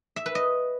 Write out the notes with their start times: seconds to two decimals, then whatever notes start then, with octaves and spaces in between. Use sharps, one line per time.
0.16 E5
0.26 B4
0.35 D#5